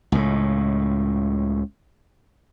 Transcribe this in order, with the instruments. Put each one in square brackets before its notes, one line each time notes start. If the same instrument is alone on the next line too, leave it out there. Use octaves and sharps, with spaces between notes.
[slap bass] C#2 A2